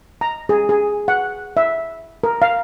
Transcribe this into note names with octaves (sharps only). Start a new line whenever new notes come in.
A#5
G#4
G#4
F#5
E5
A#4
F5